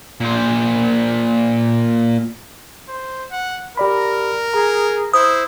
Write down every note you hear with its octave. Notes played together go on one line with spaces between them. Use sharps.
A#2 C5
C5
F#5
G4 A#4 D5 B5
G#4 A#5
E4 C5 D#6